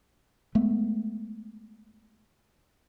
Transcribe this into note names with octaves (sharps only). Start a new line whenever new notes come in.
G#3 A3 B3